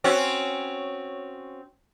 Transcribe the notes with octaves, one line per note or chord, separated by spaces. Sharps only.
C4 C#4 F#4